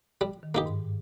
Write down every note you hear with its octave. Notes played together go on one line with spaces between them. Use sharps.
G3
D#3
G2 A#3 D#4 G4
G#2